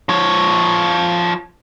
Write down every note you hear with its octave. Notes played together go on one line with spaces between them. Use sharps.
F3 C#5